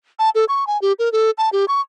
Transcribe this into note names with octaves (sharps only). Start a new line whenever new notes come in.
A5
A4
C#6
G#5
G4
A#4
A4
A5
G4
C#6